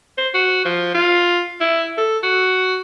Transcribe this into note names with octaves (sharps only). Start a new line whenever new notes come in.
C5
F#4
F3
F4
E4
A4
F#4